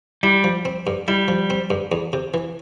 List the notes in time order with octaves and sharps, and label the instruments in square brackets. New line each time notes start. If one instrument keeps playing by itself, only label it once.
[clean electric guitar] G3 [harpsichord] E4
[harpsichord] F3
C4
G2
[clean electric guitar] G3 [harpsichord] E4
[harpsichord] F3
C4
G2
E2
C3
E3